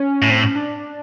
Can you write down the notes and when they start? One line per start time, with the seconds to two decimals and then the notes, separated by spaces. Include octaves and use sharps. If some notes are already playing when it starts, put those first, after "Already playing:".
Already playing: C#4
0.22 A2
0.30 C4
0.43 C#4
0.55 D4